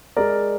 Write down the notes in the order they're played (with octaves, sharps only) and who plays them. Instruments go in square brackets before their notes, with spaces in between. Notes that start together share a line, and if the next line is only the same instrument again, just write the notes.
[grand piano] G#3 A#4 D5